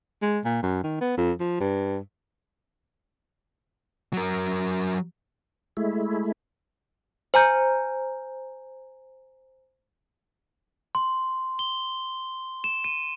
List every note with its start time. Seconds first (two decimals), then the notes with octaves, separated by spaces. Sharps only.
0.22 G#3
0.45 A#2
0.63 F#2
0.83 D#3
1.01 B3
1.18 F2
1.40 F3
1.60 G2
4.13 F#3 A#4
5.77 G#3 A3 E4
7.34 C5 G#5 A#5 G6
10.95 C6
11.59 G7
12.64 E7
12.84 D#7